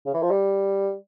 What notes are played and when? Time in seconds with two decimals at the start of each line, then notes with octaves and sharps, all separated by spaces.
0.06 C#3
0.14 E3
0.22 F3
0.31 G3